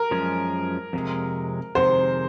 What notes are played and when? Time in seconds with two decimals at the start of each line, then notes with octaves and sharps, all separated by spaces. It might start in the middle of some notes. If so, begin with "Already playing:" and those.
Already playing: A#4
0.11 F#2 F3 G#3 C#4
0.93 F2 C3 G#3
1.75 F2 C3 D#3 G#3 C5